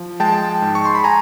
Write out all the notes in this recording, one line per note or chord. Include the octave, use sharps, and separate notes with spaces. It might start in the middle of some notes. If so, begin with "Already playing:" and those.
Already playing: F3
G#3 G5 A5
G#2
C#6
C6
B5
G#5 A#5